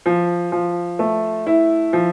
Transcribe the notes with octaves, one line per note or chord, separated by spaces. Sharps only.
F3
F3
A3
E4
F3